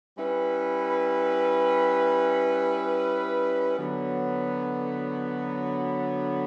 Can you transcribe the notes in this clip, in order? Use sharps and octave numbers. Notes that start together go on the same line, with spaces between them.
G3 C#4 E4 B4
D3 F#3 B3